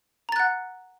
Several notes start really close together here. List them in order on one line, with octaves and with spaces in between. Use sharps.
A#5 A6 F#6 F#5